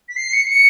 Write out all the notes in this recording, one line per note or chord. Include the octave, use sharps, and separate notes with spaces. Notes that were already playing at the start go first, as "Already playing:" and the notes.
B6
C7
C#7
C#7